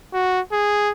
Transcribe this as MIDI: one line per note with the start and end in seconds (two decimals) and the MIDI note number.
0.13 0.41 66
0.52 0.91 68